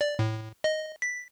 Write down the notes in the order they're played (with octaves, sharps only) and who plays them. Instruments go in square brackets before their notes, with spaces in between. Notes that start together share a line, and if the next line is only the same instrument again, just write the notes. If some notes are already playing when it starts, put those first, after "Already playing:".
[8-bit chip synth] D5
A2
D#5
B6